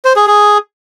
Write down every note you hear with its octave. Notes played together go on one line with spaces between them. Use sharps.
C5
G#4
G#4